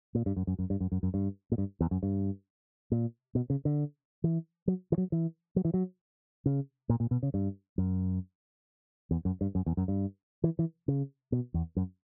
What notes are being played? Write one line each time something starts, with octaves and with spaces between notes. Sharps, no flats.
A#2
G2
F#2
F#2
F#2
G2
F#2
F#2
F#2
G2
A#2
G2
E2
F#2
G2
A#2
B2
C#3
D3
E3
F#3
E3
F#3
E3
F#3
E3
F#3
C#3
A#2
A#2
B2
C#3
G2
F#2
E2
F#2
G2
F#2
E2
F#2
G2
E3
E3
C#3
B2
E2
F#2